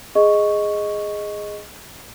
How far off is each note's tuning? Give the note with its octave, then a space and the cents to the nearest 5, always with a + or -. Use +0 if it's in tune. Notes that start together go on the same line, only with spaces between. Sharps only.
G#4 +0 D#5 +0 C#6 +0